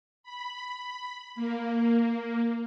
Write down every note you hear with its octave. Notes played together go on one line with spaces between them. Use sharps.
B5
A#3